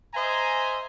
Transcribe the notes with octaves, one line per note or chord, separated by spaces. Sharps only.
C5 D#5 E5 G#5 A#5